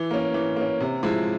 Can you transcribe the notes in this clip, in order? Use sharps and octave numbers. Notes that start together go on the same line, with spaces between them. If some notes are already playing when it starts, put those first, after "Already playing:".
Already playing: E3
A#3 C#4
E3
A#3 C#4
C3
F3 G#3 E4